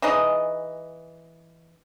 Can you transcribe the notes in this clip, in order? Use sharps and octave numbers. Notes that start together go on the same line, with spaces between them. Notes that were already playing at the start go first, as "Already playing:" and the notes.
E3 D#4 G#4 D#5